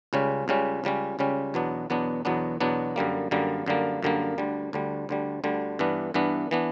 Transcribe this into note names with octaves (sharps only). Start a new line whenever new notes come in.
C#2 C#3 G3 C#4
C#2 C#3 G3 C#4
C#2 C#3 G3 C#4
C#2 C#3 G3 C#4
E2 B2 F#3 B3 D4
E2 B2 F#3 B3 D4
E2 B2 F#3 B3 D4
E2 B2 F#3 B3 D4
F#2 D3 G3 A#3
F#2 D3 G3 A#3
F#2 D3 G3 A#3
F#2 D3 G3 A#3
D2 D3 G3
D2 D3 G3
D2 D3 G3
D2 D3 G3
G2 E3 B3 D4
G2 E3 B3 D4
E3 B3 D4